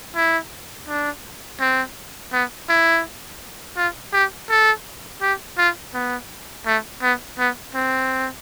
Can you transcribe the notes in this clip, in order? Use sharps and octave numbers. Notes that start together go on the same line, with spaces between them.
E4
D4
C4
B3
E4
F4
G4
A4
G4
F4
B3
A3
B3
B3
C4